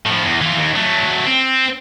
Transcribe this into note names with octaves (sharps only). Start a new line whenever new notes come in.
A2 F3
E2
E3 F4
D#2
F#3 A3
C4